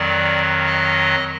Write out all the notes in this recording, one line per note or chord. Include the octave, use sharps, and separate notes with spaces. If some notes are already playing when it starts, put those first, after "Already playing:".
Already playing: F2 D#3 F#3 D5
D#5